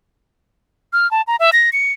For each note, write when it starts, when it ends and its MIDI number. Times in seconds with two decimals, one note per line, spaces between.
0.93 1.10 89
1.11 1.22 81
1.27 1.36 82
1.40 1.50 76
1.53 1.70 94
1.73 1.92 97